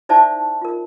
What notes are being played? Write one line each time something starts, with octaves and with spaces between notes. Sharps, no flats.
D#4 E4 C5 D5 E5 A5
F4 A#4